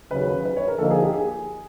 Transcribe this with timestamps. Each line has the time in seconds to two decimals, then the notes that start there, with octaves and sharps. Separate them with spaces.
0.10 D#2 C#3 F#3 B4
0.45 B4
0.56 C#5
0.68 A#4
0.78 D3 F3 A#3 D#4 A4
0.91 G#4
1.02 G4
1.13 G#4